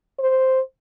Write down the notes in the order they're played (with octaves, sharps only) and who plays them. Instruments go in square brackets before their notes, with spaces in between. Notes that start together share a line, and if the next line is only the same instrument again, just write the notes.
[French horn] C5